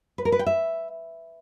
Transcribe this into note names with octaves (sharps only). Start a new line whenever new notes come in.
B4
A#4
B4
G5
E5